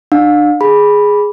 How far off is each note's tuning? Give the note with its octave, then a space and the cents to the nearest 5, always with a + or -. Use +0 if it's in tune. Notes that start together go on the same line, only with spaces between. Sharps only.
D4 +35 F5 +35
G#4 +0 B5 -10